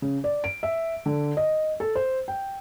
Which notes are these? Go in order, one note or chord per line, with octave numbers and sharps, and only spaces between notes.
C#3
D5
D7
E5
D3
D#5
A4
C5
G5